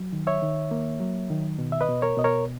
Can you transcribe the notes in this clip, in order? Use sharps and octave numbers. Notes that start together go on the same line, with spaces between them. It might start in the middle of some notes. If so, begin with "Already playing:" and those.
Already playing: F#3
D#3
C#5 E5
D#3
A#3
F#3
D#3
B2
E5
B4 D#5
B2
A#4 C#5
B2 D#5
A#4 C#5